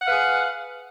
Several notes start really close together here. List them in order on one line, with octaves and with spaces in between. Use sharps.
F#5 F5 B4 G#4